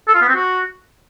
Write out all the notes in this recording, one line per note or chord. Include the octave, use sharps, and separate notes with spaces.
A4
F4
B3
C4
F#4